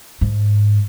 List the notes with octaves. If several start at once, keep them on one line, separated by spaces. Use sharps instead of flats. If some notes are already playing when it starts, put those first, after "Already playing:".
G#2